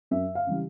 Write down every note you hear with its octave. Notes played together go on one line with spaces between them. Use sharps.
F#2 E5
F5
C#3 E3 G3